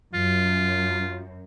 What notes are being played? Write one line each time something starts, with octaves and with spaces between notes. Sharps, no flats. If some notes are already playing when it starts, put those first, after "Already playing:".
F#2 F4